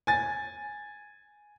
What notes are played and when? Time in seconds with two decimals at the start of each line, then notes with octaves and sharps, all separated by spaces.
0.07 G#5 A6